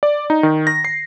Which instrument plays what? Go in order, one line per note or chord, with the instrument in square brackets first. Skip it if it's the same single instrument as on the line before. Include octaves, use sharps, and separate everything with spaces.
[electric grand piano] D5
D#4
D#3
A#6
C7